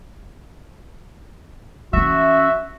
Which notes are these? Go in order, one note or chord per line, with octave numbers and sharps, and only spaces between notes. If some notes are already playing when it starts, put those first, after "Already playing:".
E3 C#4 F#4 E5